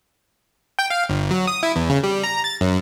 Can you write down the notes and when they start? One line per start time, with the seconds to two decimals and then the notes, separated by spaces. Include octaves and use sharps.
0.79 G5
0.90 F5
1.09 G1
1.31 F#3
1.47 D#6
1.63 E4
1.76 E2
1.90 C#3
2.03 G3
2.23 A#5
2.44 A6
2.61 F#2